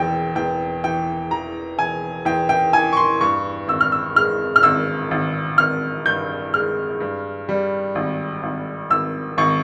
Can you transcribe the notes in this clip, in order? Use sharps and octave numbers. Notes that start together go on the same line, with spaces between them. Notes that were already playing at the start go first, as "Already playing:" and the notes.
Already playing: E1 E2 G5
E2 G5
E3 G5
E3 A#5
E1 G#5
E2 G5
G5
E3 G#5
C#6
C6
G2 C#6
G#1 E6
F6
E6
G#3 F6
F6
G#1 E6
G#1
G#1 F6
G2 G6
G#3 F6
G2
G3
G#1
G#1
G#1 E6
G#1 C#6